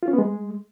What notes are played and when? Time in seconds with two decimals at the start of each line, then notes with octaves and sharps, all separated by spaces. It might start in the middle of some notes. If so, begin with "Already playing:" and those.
0.03 F4
0.08 C#4
0.13 B3
0.18 G#3